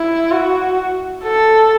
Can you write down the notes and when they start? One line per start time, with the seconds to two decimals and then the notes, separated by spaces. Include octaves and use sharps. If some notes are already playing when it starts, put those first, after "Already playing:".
Already playing: E4
0.31 F#4
1.24 A4